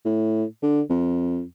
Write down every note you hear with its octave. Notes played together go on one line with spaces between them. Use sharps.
A2
D3
F2